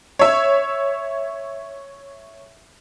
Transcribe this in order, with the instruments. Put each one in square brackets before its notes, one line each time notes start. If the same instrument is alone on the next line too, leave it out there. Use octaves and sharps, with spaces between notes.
[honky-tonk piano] C#5 E5